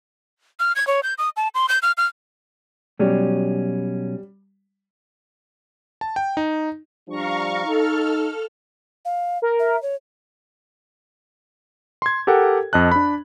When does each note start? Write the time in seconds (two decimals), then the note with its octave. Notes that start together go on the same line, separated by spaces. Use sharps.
0.60 F6
0.76 G#6
0.87 C#5
1.03 G6
1.18 D#6
1.37 A5
1.55 C6
1.69 G6
1.82 F6
1.98 F6
3.00 B2 F#3 G3 C#4
6.01 A5
6.16 G5
6.37 D#4
7.09 F3 G3 D4 F5 A#5 C#6
7.66 D#4 A4 F6
9.05 F5
9.42 A#4
9.59 E5
9.82 C#5
12.02 C6 G#6
12.27 G4 A4 A#4 F#5 G5
12.73 F2 D#5 A5 F#6
12.91 D4 B5